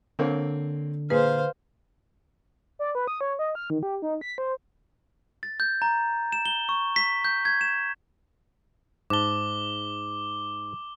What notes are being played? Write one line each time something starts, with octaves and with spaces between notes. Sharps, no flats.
D3 A#3 C4 C#5
A#2 G#4 B4 C5 F5
D5
B4
D#6
C#5
D#5
F6
D#3
G4
D#4
B6
C5
A6
G6
A#5
E7
G7
C#6
B6
G6
G#6
E7
G#2 A5 D6 G7